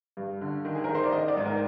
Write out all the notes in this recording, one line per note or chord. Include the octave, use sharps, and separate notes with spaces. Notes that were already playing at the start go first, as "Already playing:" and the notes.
G2
D3
D#3
G#4
A#4
D#3
C5
D5
D#3 D#5
D5
G#2
A#4